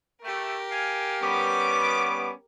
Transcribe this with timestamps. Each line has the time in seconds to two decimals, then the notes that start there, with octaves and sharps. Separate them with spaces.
0.22 A3 G4 A#4
0.70 F5 G#5
1.21 G3 B3 C#4 D6